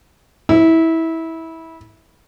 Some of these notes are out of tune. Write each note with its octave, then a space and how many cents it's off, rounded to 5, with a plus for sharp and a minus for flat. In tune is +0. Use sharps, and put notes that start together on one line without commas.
E4 -20